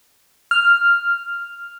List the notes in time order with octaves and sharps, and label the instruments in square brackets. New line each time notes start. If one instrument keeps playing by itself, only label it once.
[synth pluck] F6